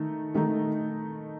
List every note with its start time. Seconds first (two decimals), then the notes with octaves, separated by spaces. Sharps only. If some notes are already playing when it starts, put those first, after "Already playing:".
Already playing: D#3 A3 D#4
0.34 D#3 A3 D#4